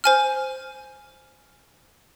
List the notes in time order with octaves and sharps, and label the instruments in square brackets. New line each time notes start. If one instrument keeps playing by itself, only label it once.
[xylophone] C5 G#5 F6